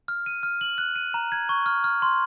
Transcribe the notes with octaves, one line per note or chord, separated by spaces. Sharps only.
F6
D#7
F6
F#7
F#6
D#7
A#5
G#6
C#6
F6
F6
C6